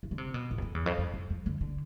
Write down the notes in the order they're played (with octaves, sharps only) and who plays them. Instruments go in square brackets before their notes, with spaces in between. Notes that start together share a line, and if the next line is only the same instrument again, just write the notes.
[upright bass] E3
D3
C3
B2
A2
E2
F2
E2
F2
F2
F2
F2
D3
D3